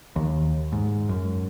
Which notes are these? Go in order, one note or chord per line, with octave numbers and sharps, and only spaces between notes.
D#2
G#2
F#2